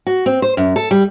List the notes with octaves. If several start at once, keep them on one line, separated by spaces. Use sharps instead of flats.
F#4
C4
C5
F#2
A4
G3